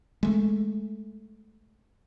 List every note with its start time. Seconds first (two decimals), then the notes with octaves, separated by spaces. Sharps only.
0.23 G#3 A3